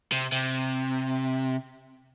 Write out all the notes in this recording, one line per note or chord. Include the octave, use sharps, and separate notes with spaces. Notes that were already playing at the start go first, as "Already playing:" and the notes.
C3
C3